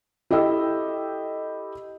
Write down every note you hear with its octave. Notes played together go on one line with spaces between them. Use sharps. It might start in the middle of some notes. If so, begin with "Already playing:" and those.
E4 G4 A4 D#5 G5 E6